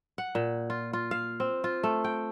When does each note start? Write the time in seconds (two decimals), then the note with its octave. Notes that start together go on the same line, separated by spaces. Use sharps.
0.18 F#5
0.35 A#2
0.70 F4
0.93 F4
1.11 F5
1.40 C4
1.64 F4
1.83 A3
2.04 G5